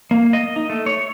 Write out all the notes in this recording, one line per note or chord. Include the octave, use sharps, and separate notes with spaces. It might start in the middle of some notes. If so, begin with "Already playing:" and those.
A#3
D#5
D#4
A3
C#5